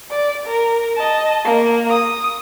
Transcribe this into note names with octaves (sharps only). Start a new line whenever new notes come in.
D5
A#4
D#5 A5
A#3
D#6